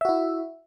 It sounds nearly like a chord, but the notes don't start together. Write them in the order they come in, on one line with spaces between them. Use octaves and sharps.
E5 F#4 E4